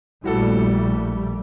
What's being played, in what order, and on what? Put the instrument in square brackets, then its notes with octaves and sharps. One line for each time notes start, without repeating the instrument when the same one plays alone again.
[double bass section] A#1 G3 A3 [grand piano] E4 F#4 A4